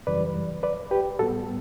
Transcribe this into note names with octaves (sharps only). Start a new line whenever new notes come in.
F#2 C#3 E3 G3 B4 D5
B4 D5
G4 B4
A2 G3 B3 F#4 A4